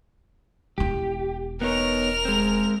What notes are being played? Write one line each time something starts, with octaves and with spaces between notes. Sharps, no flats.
E1 E4 G4
B3 D#4 A#4 C#5 F7
G#3 C4